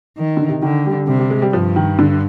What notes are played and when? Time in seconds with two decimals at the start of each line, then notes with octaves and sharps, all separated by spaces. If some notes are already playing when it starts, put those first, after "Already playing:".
0.18 D#3
0.37 D3
0.48 C3
0.62 D3 D#3
0.86 G3
1.08 C3 G3
1.19 G3
1.30 G#3
1.42 G3
1.53 G2 F3
1.76 D#3
1.99 D3